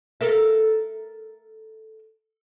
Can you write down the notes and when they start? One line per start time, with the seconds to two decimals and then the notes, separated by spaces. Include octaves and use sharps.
0.21 A4 A#4 E5